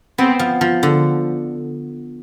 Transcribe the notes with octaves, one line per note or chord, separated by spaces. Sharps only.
B3 C4
F3
F3
D3